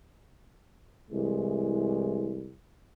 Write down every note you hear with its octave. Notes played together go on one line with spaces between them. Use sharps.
C2 E3 G#3